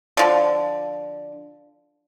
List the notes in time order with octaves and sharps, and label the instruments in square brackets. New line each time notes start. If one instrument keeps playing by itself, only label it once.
[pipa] D3 F3